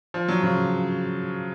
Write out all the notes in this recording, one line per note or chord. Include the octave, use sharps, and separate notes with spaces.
F3
F#3
C#3 F3